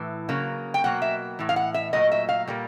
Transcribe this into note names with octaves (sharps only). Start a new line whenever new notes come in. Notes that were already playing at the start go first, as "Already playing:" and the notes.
Already playing: A2 E3
C#3 F#3 A#3
G5
B2 F#3 A#3 F#5
E5
A2 E3
F5
F#5
E5
A#2 F#3 A3 D#5
E5
F5
A#2 G3 A#3